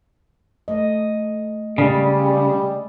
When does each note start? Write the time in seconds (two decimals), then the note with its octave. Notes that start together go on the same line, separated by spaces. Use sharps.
0.68 A3 D#5
1.78 C#3 G3 G#3 G#4 D5